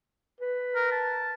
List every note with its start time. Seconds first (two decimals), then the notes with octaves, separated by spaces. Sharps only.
0.41 B4
0.76 A#4
0.92 A5